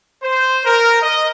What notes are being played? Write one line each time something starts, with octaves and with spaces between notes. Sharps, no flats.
C5
A#4
D#5